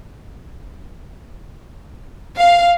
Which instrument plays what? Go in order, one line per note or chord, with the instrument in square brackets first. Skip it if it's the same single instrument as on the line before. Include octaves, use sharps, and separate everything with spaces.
[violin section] F5